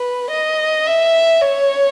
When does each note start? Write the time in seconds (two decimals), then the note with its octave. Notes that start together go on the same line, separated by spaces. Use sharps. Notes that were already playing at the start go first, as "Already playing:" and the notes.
Already playing: B4
0.31 D#5
0.86 E5
1.42 C#5